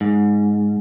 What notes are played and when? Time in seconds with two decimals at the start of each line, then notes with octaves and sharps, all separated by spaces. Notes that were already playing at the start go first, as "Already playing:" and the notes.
0.01 G#2